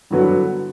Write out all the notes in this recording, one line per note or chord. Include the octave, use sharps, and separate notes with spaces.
G2 D3 F#3 B3 F#4